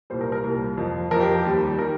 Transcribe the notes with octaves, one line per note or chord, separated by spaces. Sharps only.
C2 A#2 G3 C5
A#4
A#4
C2 A#2 G3
F2 F3
F2 F3 A#4
G4
G4
D#2 D#3 G3
D#3 G3 A#4